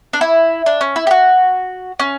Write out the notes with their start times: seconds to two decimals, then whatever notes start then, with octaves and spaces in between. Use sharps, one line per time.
0.13 D4
0.21 E4
0.66 D4
0.81 C#4
0.96 E4
1.07 G4
1.11 F#4
2.00 C#4